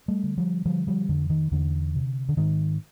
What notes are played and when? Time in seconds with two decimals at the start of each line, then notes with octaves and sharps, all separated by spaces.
0.08 G3 A3
0.23 D3
0.38 F3 G3
0.65 D3 F3 G3
0.87 F3 G3
1.09 F2 D3
1.30 D#3
1.52 E2 D3
1.95 C3
2.29 D3
2.37 G#2 D#3